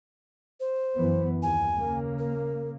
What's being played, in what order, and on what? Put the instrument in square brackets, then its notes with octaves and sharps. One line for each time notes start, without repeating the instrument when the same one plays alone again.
[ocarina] C5
[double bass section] F#2 E3 B3
[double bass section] D#2 [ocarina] G#5
[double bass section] C#3 A#3
[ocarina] A#4